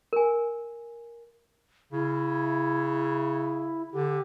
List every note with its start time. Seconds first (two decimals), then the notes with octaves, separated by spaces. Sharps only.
0.13 A#4 G#5
1.92 C#3 E4
3.92 D3 G4